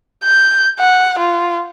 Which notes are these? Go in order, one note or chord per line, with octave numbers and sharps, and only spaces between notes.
G6
F#5
F4